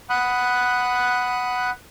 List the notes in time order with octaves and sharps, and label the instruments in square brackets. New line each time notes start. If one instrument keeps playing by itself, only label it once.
[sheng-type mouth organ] F#5 B5 D#6 F#6